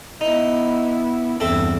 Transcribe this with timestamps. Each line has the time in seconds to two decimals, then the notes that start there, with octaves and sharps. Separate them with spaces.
0.21 B3 D#4 E4
1.40 E2 G2 C4 A4 E5